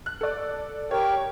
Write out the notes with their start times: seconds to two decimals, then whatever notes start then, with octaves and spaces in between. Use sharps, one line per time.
0.06 F#6
0.21 A4 D5
0.91 G4 A#4 C#5 G5